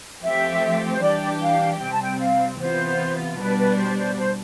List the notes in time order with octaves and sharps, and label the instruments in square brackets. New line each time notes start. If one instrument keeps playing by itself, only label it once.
[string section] F3 A3 C4 G4 [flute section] E5
[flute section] C5
[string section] E3 G3 D4 G4 [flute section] D5
[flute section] F5
[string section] C3 G3 C4 [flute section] G5
[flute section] A5
G5
F5
[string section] C3 E3 B3 F4 [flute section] C5
[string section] B2 G3 D4 [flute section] B4
[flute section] B4
C5
C5
C5